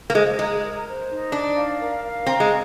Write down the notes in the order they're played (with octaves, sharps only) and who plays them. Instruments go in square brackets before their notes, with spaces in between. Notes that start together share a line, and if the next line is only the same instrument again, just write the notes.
[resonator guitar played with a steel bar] A#3
[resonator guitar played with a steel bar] G#3 [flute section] C5
[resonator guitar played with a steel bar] G#3 [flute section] A#5
[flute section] A#4
C5
D#4
[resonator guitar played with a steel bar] D4 [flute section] D5
[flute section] F5
A#4
F5
[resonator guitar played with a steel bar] C4 [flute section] A#5
[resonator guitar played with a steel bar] G#3